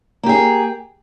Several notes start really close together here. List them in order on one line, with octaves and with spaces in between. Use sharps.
A#3 G4 G#4